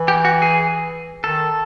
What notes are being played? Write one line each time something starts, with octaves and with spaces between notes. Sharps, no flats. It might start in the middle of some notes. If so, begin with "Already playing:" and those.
Already playing: E3
G4
F#4
G#4
D#3 A4